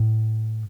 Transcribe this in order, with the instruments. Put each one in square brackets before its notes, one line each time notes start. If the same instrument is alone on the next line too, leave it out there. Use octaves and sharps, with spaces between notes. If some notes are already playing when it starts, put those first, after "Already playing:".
Already playing: [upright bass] A2